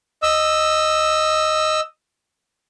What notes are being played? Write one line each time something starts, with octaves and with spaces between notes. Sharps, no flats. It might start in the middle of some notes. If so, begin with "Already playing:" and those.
D#5 E6